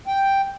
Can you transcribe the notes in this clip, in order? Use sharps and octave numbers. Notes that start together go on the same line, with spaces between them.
G5